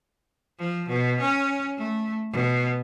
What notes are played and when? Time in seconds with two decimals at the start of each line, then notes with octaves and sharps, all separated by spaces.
0.59 F3
0.88 B2
1.20 C#4
1.77 A3
2.32 B2